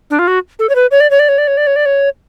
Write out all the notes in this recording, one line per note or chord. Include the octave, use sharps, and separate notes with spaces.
D4
F4
F#4
A4
C#5
B4
C#5
D5
C#5
D5
C#5
D5
C#5
D5
C#5
D5
C#5